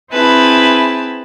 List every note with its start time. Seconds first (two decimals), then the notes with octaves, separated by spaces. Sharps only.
0.12 C4 E4 G#4 B4 A5